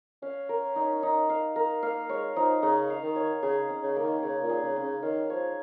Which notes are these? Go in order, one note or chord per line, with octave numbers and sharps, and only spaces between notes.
C#4 F5
A#4
D#4
D#4
F5
A#4
A#3 F5
G#3 C#5
F3 D#4
C#3 D#4
F5
D#3
C#5
C#3 G#4
C#4
C#3
A#3
D#3
C#3 C#5
A#2
G#4
C#3
C#4
C#3
D#3 F5
F3 C#5